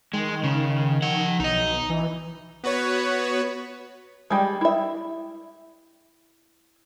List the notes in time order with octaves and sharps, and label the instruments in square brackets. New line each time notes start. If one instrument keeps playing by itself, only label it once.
[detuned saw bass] D#3 [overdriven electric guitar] G#3
[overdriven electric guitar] C#3
F3 F#5
[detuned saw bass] B1 [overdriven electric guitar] D#4 D#5
[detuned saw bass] E3
[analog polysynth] B3 F#4 B4 C#5
[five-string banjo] G3 G#3
E4 E5